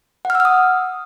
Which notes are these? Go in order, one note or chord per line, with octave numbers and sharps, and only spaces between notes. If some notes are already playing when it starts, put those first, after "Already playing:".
F#5
F6
E6
F6
D#6